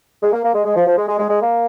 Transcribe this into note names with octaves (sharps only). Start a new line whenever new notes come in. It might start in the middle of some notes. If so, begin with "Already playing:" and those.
G#3
A#3
A#3
G#3
G#3
F3
F3
G#3
G#3
G#3
G#3
A#3